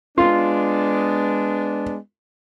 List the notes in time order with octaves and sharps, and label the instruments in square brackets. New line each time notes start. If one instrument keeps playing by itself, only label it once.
[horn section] G#3 B3 D4 [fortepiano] F4